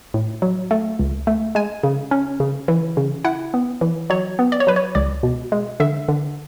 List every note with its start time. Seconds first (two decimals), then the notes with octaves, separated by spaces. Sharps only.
0.14 A2
0.42 F#3
0.71 A3
0.99 C#2
1.27 A3
1.55 G#3 G#5
1.83 C#3
2.11 C#4
2.40 C#3
2.68 E3
2.97 C#3
3.24 E4 F#5
3.54 B3
3.81 E3
4.10 F#3 C#5
4.39 B3
4.52 D5
4.60 C#5
4.67 F#3 B4
4.76 C#5
4.95 C#2 D5
5.23 B2
5.52 G#3
5.80 D3 E5
6.08 D3